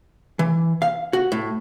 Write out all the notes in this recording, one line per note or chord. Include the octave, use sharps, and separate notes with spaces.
E3
F5
F#4
A2